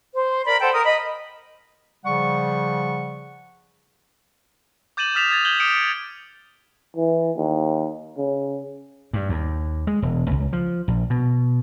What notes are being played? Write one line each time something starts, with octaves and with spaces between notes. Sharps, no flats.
C5
A#4 D5 B5
A4 C5 F#5 G5
A#4 D#6
D#5 B5
C#3 F3 G3 F#5 C#6
D6 G6 A6 D#7 E7 F#7
D#6 F6 A6 B6 E7 F7
D#6 G#6 A6 F7
G6 G#6 F#7 G7
D6 D#6 F6 C#7 D7 F7
C#7
E3
D#2
C#3
G2
D#2
G#3
E1
C#2
F3
A#1
B2